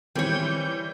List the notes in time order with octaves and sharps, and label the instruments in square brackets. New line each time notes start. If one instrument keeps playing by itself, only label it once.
[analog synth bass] D#3 [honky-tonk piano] E3 C4 [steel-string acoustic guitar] G3 C#5 [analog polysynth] G6